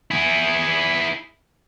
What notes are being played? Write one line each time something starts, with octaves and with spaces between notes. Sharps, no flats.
E4 G#4